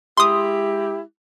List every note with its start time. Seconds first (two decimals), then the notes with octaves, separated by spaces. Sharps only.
0.17 G#3 E4 G4 C6 D#6